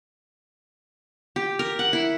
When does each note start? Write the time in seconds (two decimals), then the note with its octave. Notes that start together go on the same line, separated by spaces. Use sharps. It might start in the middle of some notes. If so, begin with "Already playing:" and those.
1.36 G4
1.59 A#4
1.79 F#5
1.93 E4